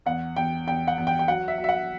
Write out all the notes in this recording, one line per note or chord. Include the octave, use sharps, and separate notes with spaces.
E2 F#5
E2 G5
E2 G5
F#5
E2
G5
G5
F#3 F#5
E5
F#3
E5
F#5